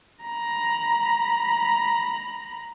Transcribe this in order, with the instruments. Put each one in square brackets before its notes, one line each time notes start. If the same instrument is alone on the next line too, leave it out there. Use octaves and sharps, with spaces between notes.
[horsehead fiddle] A#5 B5